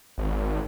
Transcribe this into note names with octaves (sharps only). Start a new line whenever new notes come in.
G#1